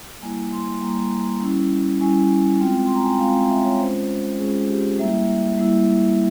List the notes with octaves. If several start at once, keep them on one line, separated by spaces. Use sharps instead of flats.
G3 A#3 E4 G#5
C6
G3 A#3 E4 A#5
G3 C#4 E4
G3 C#4 E4 G#5
G#3 C4 F4 G5
C6
A#5
G#5
G5
G#3 C4 F4 F5
E5
C#5
G#3 C#4 F4 C5
G#3 C#4 F4 G#4
G4
G3 A#3 E4 E5
G3 A#3 E4